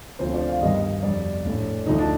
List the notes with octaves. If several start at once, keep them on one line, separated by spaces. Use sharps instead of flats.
D2 C3 F3 A3 C5
D5
F5
G1 G2 D#3 G3 D#5
F2 C3 G3 D5
A#1 A2 A3
D2 D3 F3 A3 D#4
D4